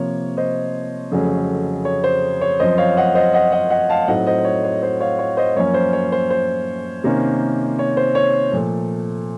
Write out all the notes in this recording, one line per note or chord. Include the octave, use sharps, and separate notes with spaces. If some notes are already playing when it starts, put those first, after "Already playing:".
Already playing: C3 F3 A#3 C#5
C5 D#5
F2 C#3 F#3 A3 C#4
C#5
C5
C#5
F#2 F3 C4 C5 D#5
C#5 F5
D#5 F#5
C5 D#5
D#5 F#5
D#5 F#5
D#5 F#5
F5 A5
A2 F#3 C4 D#4 D#5 F#5
C5 D#5
C#5
C#5
C5 D#5
C#5 F5
C#5
C5 D#5
F#2 F3 A#3 C#4 C#5
C5
C#5
C5
C5
C3 D#3 A#3 C#4
C#5
C5
C#5
A#2 F3 A3